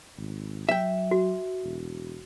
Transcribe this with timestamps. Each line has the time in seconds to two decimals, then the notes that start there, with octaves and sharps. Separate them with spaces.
0.17 G#1
0.69 F#3 E5 G5
1.11 F#4
1.63 E1